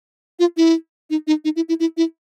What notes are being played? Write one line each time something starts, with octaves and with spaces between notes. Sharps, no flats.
F4
E4
D#4
D#4
D#4
E4
E4
E4
E4